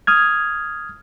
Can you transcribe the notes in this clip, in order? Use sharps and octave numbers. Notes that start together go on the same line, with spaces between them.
D#6 F6 G#6